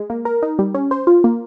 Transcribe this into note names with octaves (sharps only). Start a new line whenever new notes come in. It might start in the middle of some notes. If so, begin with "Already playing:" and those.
Already playing: G#3
A#3
A#4
D#4
G3
C#4
C5
F4
A#3